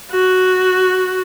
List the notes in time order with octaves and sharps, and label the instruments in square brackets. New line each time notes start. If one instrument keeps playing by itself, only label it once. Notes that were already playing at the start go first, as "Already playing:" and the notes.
[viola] F#4